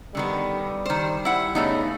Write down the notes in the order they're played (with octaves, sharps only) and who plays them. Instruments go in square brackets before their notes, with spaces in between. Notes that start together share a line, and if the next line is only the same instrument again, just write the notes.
[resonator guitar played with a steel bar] D3 D#3 B3 [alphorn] G3
[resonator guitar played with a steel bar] D#3 C5
E4 F#5
[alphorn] C#3 [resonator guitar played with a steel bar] A3 B3 D#4